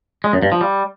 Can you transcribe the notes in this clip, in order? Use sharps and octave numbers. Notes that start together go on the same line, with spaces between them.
G#3
F#2
G2
F3
G3